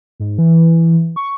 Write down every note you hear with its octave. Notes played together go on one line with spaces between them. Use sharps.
G#2
E3
C#6